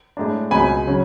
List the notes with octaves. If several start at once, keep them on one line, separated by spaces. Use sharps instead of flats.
A2 G#3 D4
C#2 B2 G#3 G#5 B5
C#3 F#3 C#4